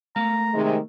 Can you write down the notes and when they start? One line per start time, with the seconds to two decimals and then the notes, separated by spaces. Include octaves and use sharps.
0.16 A3 A#3 F5 A#5
0.54 C3 D#3 G#3